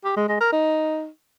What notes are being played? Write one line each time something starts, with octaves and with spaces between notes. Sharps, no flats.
G4
G#3
G#3
A#4
D#4